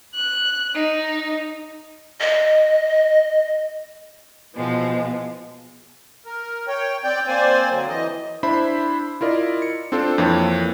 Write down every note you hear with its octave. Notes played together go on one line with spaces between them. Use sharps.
F#6
D#4
D#5
B2 E3 F3 G#3
A#4
C#5 G5
C4 D5 G5 G6
A#3 C4 C5 D5 G#5
D3 F#3
E3 D#5
D4 E4 C5 E5 B5
E4 F4 A#4 D5 D#5
C#7
C4 D4 F4 A4 C5
F2 E3 A#3 C#5